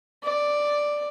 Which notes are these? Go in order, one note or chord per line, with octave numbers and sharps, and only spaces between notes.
D5